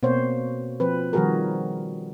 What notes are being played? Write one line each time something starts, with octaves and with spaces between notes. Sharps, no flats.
B2 A#3 C4 C5 C#5
F3 C4 B4
D#3 F3 G3 F#4 G#4 A#4